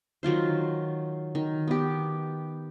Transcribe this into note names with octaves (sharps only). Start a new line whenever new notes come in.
D#3 F#3 F4 C5
D#3
B3 G4